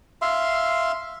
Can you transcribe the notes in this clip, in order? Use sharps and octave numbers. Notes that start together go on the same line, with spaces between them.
E5 F5 C6